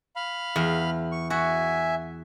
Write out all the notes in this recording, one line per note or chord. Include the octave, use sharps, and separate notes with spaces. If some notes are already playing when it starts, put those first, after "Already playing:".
F5 B5
E2
C#6
F#4 E5 G#5